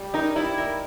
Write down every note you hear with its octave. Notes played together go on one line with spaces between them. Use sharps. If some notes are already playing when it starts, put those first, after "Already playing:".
Already playing: G3
D#4 A#4
G3 E4
A#4